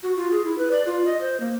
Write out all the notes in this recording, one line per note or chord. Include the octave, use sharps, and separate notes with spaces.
F#4
F4
G#4
E4
B4
D5
F4
D#5
C5
A#3